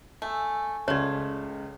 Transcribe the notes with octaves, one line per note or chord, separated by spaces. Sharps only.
A3 G#5 E6
C#2 C#3 A3 F4 C#5 D5